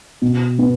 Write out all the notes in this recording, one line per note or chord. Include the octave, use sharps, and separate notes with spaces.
B2
B3